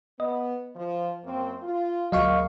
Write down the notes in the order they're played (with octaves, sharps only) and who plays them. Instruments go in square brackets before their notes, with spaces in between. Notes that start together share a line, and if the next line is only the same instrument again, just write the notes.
[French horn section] B3 [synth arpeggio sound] D#5
[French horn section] F3
F#2 A#3 C4
F4
[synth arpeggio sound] D2 F#3 [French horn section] G#3 A#3 A#4 [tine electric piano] D#5 F5 C#6